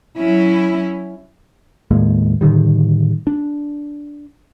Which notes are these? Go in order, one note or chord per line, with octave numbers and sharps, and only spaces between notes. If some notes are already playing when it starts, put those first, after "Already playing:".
F#3 C#4 E4
D#2 A2 G#3 A#3
A2 D3 D#3 G3
D4